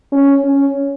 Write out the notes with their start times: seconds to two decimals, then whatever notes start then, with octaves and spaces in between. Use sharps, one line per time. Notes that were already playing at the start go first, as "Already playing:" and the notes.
0.12 C#4
0.45 C#4